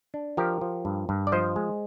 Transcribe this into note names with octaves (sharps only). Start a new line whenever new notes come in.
D4
F3 G4 A#4
F3
G2
G2
D5
F3 C5 D#5
G#3